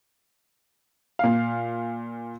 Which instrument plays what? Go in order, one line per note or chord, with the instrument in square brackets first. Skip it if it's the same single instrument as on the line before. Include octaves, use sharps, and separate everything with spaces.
[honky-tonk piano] A#2 F5